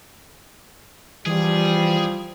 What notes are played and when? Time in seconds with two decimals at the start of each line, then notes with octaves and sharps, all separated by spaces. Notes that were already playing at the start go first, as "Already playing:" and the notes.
1.26 E3 F3 G3 G#4